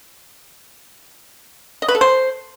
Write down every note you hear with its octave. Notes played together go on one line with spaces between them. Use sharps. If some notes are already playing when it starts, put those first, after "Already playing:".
D#5
B4
A4
C5